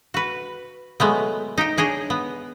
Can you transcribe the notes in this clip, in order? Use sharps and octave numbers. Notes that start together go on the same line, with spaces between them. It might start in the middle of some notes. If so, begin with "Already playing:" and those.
F#4 B4
F#3 G#3 A3 B3
D#4 G4 G5
D4 G#4 C#5 D#5
B3